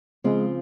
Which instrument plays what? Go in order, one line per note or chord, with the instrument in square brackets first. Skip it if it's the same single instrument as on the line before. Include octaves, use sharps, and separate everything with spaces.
[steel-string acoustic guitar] C#3 F3 C4 F4 [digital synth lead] G#3